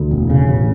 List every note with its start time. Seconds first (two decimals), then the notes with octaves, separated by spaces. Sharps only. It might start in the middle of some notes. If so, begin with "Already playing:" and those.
Already playing: D2
0.11 E1
0.30 C#3
0.47 A1